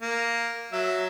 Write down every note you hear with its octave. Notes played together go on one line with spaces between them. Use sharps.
A#3
F#3 E5